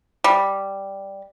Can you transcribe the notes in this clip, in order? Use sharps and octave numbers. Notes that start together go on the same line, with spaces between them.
G3